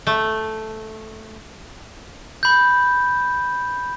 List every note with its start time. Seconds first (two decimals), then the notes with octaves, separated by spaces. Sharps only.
0.07 A3
2.43 B5 G6